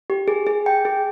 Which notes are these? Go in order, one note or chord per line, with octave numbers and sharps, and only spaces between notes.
G4
G#4
G#4
G5
G#4